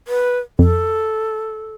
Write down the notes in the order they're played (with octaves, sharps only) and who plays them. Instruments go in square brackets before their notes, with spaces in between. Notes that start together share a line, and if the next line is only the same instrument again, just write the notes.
[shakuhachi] B4
[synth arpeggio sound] F2 [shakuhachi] A4